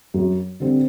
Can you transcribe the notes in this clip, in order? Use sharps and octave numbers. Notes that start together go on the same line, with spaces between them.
F#2
D3 G3 C4